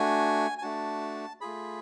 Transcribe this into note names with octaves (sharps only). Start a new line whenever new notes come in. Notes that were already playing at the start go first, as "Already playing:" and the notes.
Already playing: A3 D4 F#4 G#5
G#5
A3 D4 F#4 A5
A3 F4 G#4 B5